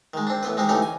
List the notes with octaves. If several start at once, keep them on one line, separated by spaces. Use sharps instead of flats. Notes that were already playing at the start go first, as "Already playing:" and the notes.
D#3 G#3
C4 D4
A1 B3 B4
G#3 C4 D#4 G4
D3 E3 A3 C#4 D#4 G4
G#5